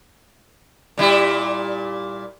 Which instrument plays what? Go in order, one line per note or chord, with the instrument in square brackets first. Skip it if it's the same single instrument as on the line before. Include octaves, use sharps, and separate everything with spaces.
[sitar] A#2 G3 E4